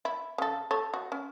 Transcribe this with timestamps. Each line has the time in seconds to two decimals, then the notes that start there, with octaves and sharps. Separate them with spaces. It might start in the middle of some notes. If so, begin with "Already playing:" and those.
0.05 E4
0.38 C#3 A4
0.71 A4 C#5
0.94 F#4
1.12 C#4